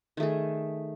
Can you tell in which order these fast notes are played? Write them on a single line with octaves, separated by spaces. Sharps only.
D#3 A3 G#4